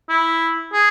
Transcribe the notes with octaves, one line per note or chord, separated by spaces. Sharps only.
E4
G#4